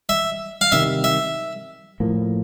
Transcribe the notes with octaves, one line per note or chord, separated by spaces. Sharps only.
E5
F5
C3 D#3 G3 E5
E5
A2 F3 A#3